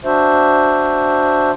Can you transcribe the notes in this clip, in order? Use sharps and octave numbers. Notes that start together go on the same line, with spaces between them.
D4 F#4 C5 E5